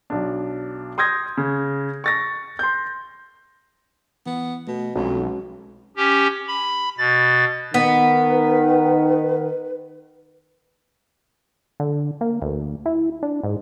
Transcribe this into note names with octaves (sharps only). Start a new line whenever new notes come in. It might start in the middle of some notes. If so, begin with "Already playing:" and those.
B1 D4
C6 D#6 G6 G#6 A#6
C#3
C#6 A6 A#6
C6 G6
E3 B3
B2 A3
B1 F2 G#3 C#4 F#4
C#4 G4
B5
B2 A6
D#3 B3 B4
D3
A#3
D2
E4
D4
G#2